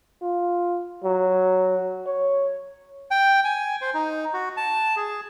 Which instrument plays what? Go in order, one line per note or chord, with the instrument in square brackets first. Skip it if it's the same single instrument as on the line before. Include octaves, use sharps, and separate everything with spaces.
[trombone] F4
F#3
C#5
[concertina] G5
G#5
C5
D#4
F#4
A5
G#4